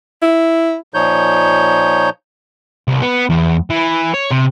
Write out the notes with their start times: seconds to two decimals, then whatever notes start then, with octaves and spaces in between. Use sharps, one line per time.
0.22 E4
0.94 A#2 F3 D#4 C#5 G6
2.88 C2
3.02 B3
3.30 E2
3.70 E3
4.14 C#5
4.31 C3